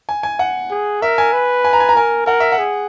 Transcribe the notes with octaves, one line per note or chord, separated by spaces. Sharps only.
G#5
G#5
F#5
G#4
A#4 E5
G#5
B4
G#5
A#5
G#5
A#5
A#4 G#5
A#4 F#5
E5
F#5
G#4